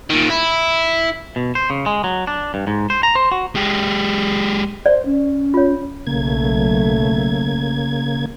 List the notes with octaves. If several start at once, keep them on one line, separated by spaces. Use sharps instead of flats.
A#2 D#3
E4
B2
C5
C#3
G#3
F#3
D4
G2
G#2
C5
A#5
C5
F#4
G#3 G4
C5 D5
C#4
F4 C#5
B1 C#3 A3 A#3 G#6